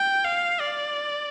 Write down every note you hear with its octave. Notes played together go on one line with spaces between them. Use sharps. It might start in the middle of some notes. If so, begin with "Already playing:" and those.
Already playing: G5
F5
D5